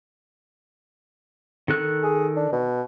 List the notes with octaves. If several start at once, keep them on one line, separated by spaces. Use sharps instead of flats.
D#3 A4 F#6
G#4
D4
B2